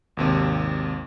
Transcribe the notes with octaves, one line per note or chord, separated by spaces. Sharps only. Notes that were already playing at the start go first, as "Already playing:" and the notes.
G#1 D#2 C3